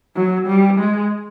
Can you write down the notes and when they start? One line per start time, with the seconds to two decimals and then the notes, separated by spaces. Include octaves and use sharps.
0.16 F#3
0.47 G3
0.79 G#3